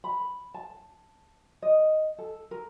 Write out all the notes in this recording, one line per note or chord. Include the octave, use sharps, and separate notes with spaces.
B5
A5
D#5
A4
A#4